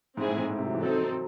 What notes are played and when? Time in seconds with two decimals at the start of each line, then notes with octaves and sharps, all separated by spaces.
0.17 G#2 G#3 C4 E4 G#4
0.28 A2
0.38 G#2
0.50 A2
0.58 C3
0.66 F#3
0.74 E3
0.82 F#3 C4 D#4 A4
0.99 F#3